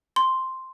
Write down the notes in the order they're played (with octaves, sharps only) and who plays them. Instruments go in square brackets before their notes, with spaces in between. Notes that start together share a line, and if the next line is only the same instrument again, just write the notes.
[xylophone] C6